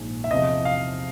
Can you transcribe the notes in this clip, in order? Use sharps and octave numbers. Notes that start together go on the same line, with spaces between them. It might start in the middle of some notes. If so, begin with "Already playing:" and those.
Already playing: A#1 G#2 D#3
E5
E2 C3 F3 D#5
F5